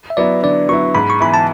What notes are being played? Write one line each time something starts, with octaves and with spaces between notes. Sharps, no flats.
E5
F#3 B3 E4 D5
D3 D5
F#3 B3 E4 C#6
G#2 B5
C#6
E3 B3 E4 B5
A5